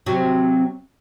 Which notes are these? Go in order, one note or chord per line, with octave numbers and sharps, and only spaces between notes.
C3 F#3